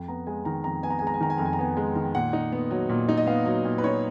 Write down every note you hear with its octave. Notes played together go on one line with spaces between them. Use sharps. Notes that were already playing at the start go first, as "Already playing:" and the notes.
Already playing: F2
B3 A#5
G#3 G#5
D#3 A#5
F2 A#5
B3 G#5
A#5
G#5
G#3
A#5
G#5
D#3 A#5
G#5
F2 A#5
G#5
A#5
B3 G#5
G#3
D#3
A#2 F#5
D#4
B3
F#3
A#2
D#4
D#5
B3 F5
F#3
A#2
B4
D#4 C#5